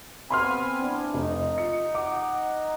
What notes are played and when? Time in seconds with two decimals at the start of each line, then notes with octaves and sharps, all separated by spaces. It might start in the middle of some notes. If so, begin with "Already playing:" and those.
0.30 B3 C4 G#5 B5 C6 F6
0.80 E3 C4 D4
1.14 F1 D#4
1.58 F4 C#7
1.95 F#5 A#5 D6